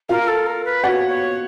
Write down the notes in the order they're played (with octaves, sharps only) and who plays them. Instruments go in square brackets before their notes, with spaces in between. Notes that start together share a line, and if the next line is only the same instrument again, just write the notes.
[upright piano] F4 F5 [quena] A#4
[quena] A4
A#4
B4
[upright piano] F#4 F#5 [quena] C#5 D5
[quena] C#5